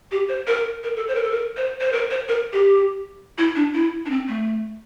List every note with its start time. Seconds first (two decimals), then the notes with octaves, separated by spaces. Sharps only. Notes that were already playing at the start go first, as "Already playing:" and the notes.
0.12 G4
0.29 C5
0.47 A#4
0.83 A#4
0.96 A4
1.08 C5
1.15 A#4
1.23 A4
1.31 A#4
1.57 C5
1.80 C5
1.92 A#4
2.11 C5
2.28 A#4
2.53 G4
3.38 E4
3.56 D4
3.74 E4
4.06 D4
4.10 C4
4.28 A3